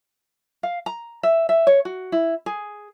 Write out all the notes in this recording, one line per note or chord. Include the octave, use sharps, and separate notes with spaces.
F5
A#5
E5
E5
C#5
F#4
E4
G#4